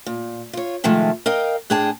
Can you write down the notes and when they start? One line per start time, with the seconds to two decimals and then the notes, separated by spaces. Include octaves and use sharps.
0.06 A#2
0.53 F4 C#5
0.84 C3 D#3 F3 G#3 A3
1.26 A#4 D#5 F5 G5
1.70 A2 D4 G#4 G5 A5